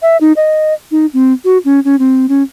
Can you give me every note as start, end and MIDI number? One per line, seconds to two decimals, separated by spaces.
0.02 0.17 76
0.21 0.33 63
0.36 0.73 75
0.91 1.06 63
1.13 1.33 60
1.44 1.58 66
1.65 1.80 61
1.85 1.96 61
1.99 2.26 60
2.29 2.43 61